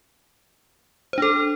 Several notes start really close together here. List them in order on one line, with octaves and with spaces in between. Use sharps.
C5 D4 A4